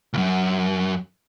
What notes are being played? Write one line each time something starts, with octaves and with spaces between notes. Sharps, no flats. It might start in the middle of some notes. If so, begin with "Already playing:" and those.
C#2 F#2